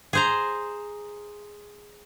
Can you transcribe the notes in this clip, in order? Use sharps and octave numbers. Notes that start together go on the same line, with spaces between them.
G#4 C5 A#5